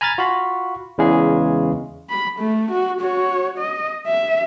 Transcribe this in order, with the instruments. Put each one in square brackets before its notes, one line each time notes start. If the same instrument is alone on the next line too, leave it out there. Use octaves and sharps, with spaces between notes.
[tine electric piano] G#5 A#5 B5 F6 G#6 A6
F4 F#4 F5 B5
E2 C#3 E3 G#3 G#4
[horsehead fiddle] B5
A3
F#4
F#4 C#5
D#5
E5